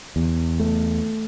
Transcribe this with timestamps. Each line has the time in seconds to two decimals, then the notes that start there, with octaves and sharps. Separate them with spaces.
0.16 E2
0.60 A3